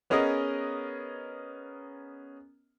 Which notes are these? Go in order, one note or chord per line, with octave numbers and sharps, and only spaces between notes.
B3 C#4 G#4 A#4 D#5